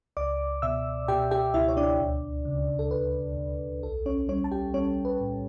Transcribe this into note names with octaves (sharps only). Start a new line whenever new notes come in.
C#2 D5 D6
B2 E5 E6
B2 G4 G5
G4 G5
C#2 E4 E5
C#5
D4 D5
D2
C#3
A4
D2 B4
D2
B1 A4
C#4 C#5
G3 C#4 C#5
A5
G4 G5
G3 C#4 C#5
B4
A2